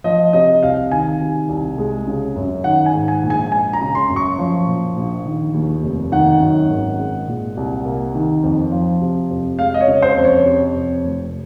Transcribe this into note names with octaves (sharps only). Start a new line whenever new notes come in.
F3 D#5
C3 D#5
C2 F5
D#3 G#5
C3
C2
G#3
C#3
F#2
D#3 F#5
G#5
G#2
G#5
A#1
G#5
G#3 G#5
A#5
C#3
C6
F#2
C#6
F3
A#2
A#1
D#3
D#2
F1
D#3 F#5
F#2
G#1
G#3
A#2
C2
A#3
D#3
F2
F3
C3
F2
G#3 F5
D#5
C#5
C#3
C5
F2
C#5
C3
F2
F1